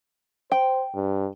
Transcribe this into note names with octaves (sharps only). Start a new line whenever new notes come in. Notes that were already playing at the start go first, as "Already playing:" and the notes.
C5 G5
G2